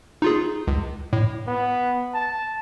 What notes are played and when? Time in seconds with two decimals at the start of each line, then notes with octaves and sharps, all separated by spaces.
0.22 D#4 F4 G#4
0.68 C#2
1.13 A2
1.47 B3
2.14 A5